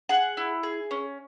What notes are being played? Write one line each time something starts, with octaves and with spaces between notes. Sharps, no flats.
G#4 F#5
E4
G#4
C#4